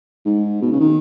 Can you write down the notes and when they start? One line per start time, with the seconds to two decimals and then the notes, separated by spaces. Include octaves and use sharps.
0.25 G#2
0.62 B2
0.72 C#3
0.80 D#3